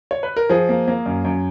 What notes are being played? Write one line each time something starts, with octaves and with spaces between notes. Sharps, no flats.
C#5
B4
A#4
F3 G#4
A#3
A#3
F#2
F#2